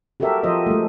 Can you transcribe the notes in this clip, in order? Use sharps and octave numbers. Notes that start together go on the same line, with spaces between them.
F#4 G4 A4 A#4 E5
F3 F4 C5 D#5
G#3 A3